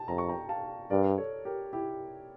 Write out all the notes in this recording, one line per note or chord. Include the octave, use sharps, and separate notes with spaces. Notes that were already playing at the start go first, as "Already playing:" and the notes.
Already playing: G5 A5
F2 A#5
C#6
G5 A#5
F5 A5
G2 A#4 D5
A4 C#5
G4 A#4
E4 G4